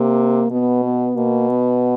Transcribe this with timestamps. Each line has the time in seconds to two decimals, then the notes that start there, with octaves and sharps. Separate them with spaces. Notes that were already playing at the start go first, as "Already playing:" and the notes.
Already playing: C3 A#3
0.51 B2 B3
0.84 B3
1.16 B2 A#3
1.49 B3